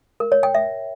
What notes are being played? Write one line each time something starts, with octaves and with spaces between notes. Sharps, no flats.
A#4
C#5
G5
E5